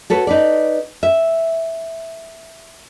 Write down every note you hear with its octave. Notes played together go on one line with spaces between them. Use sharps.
F#4 A4 B4 C#5
D#4 B4 D5
E5